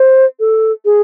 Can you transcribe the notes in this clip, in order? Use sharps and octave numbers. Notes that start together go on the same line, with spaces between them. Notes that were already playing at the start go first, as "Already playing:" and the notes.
Already playing: C5
A4
G#4